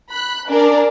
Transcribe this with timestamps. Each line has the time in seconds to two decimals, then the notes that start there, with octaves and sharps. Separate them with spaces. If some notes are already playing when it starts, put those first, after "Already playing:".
0.11 B5 F#6
0.49 D4 G#4 A#4 D5